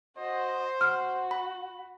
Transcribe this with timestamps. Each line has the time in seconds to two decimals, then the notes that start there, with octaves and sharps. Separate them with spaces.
0.17 F#4 C5 D#5
0.81 F#4 F6
1.31 B5